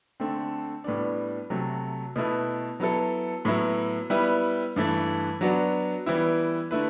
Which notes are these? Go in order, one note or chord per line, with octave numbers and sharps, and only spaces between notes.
D3 A3 C4
A2 G3 B3 D4
C3 F#3 A3
B2 A3 E4 B4
F#3 B3 E4 A4
A2 F#3 B3 E4
G3 B3 E4 B4
G2 E3 A3
F#3 B3 D4 F#4
E3 G3 B3 E4
D3 A3 E4 B4